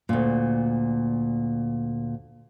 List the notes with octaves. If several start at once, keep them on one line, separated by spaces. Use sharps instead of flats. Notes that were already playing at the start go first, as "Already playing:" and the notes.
D2 A#2